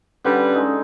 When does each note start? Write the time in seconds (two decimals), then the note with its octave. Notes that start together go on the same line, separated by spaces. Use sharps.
0.24 D3 G3 C#4 B4 D6
0.52 G#3 D#4 A4